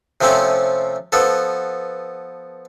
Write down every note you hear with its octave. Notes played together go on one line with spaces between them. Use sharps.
C3 F3 A3 C4 C#4
F3 B3 A4